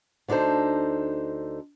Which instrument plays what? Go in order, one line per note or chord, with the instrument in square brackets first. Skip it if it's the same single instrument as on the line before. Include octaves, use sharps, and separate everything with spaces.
[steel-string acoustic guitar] D2 D4 D#4 A4 C5